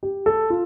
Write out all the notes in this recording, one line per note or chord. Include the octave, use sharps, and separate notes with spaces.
G4
A4
F4